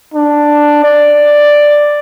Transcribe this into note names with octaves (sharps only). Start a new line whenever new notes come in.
D4
D5